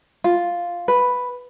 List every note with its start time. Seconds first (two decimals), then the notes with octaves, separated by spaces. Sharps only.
0.24 F4
0.88 B4